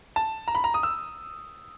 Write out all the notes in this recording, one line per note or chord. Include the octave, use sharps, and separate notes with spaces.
A5
A#5
B5
A#5
D#6
E6